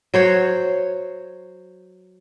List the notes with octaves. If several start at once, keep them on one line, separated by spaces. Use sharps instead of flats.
F#3 C5 C#5